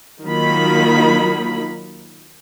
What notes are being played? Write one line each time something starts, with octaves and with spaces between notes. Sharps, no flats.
D#3 F#3 A#3 D#4 F4 B5